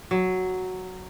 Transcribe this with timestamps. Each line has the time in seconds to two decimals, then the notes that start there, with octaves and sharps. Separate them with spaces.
0.11 F#3